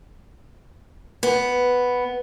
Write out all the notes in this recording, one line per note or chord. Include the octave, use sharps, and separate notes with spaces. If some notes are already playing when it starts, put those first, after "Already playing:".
B3